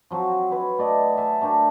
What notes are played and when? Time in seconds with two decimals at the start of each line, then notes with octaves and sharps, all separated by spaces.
0.11 F3 F#3 C4 F#4
0.51 B4 C#5 F#5
0.78 A3 D5 D#5
1.17 E5 G#5 A5
1.41 A3 D4 A#4 G5